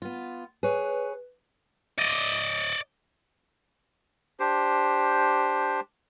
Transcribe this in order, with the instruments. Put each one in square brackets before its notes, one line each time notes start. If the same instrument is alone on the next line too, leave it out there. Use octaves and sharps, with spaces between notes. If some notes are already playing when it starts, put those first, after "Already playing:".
[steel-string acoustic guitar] B3 F4
[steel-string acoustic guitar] G#4 C#5 [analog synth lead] B4
[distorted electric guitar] D5 D#5
[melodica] D4 G4 C5